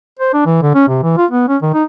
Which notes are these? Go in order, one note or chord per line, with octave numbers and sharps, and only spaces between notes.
C5
D4
E3
D3
C#4
C3
E3
F4
B3
C#4
D#3
D#4